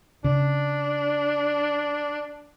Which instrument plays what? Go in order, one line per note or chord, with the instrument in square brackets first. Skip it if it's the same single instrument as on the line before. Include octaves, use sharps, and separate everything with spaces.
[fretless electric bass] C#3 [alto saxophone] D4